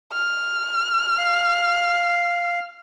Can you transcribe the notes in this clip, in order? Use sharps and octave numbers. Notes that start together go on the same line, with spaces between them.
F6
F5